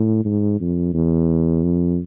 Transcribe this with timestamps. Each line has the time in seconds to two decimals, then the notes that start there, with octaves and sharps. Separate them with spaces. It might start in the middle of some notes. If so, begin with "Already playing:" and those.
Already playing: A2
0.25 G#2
0.60 F2
0.94 E2
1.63 F2